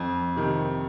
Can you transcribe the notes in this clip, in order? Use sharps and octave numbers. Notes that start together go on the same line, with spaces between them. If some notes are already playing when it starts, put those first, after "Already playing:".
Already playing: F2
C3 D#3